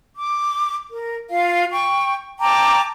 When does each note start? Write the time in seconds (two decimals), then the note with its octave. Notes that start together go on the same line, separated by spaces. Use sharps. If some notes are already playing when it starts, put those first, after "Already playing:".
0.16 D6
0.91 A#4
1.30 F4 F5
1.72 G5 C#6
2.39 G5 A5 A#5 D6